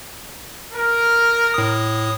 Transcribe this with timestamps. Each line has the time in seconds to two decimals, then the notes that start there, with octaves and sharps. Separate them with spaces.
0.73 A#4
1.54 A2 D#6